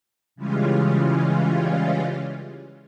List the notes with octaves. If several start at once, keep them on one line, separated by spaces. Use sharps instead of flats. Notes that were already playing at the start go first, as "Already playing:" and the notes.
C#3 E3 G3 G#3 C#4 F4